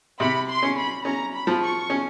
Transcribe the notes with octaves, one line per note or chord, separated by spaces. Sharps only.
C3 B5
C6
C#4
B5
C#4 A#5
B5
F3
C#6
C#4